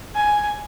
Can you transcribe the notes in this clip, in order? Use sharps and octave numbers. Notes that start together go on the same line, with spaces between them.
G#5